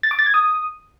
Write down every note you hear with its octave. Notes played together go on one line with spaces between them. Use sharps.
A6
D6
A6
G#6
D#6